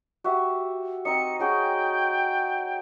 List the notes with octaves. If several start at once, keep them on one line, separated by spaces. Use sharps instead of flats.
F#4 G4 E5
C4 D#4 D#5 C#7
C#4 F#4 G#4 G5